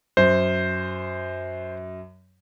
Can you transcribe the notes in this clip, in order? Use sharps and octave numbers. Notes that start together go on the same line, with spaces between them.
F#2 C5